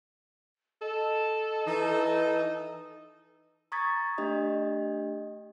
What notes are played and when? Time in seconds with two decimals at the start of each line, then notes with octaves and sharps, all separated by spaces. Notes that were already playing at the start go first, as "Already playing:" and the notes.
0.82 A4 D#5
1.66 E3 D#4
3.72 A#5 C#6 D#6 G#6 A6 B6
4.18 A3 D4 G4 D#5